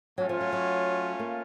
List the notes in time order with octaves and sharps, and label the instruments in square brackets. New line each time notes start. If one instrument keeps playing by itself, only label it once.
[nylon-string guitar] F#3 [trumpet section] A3 C#4 F4
[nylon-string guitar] F3
F#3
F#3
A#3